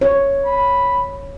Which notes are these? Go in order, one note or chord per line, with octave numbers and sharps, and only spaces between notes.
C#5
B5